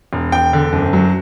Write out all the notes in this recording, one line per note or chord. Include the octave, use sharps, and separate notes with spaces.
E1
E1 G5
D3
F#1
F#3